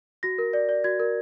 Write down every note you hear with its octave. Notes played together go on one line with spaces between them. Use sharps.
F#4 A#6
A#4
D5
D5
F#4 G#6
A#4